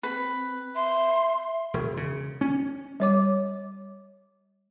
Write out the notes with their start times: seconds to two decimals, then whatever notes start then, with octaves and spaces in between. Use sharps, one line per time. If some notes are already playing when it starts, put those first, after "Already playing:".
0.03 C4 B4
0.76 E5 C6
1.74 E1
1.97 C#3
2.41 C#4
3.00 G3 C#5 D6